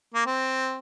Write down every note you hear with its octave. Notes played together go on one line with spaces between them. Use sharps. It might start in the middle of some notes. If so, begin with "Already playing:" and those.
A#3
C4